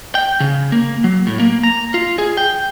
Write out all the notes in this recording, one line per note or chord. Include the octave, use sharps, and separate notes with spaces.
G5
C#3
A#3
F#3
A2
A#3
A#5
F4
G#4
G5